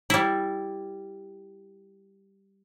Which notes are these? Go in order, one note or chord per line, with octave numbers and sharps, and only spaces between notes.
G3 E4